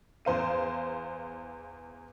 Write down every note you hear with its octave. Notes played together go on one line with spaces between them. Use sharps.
E2 C5 F5 D#7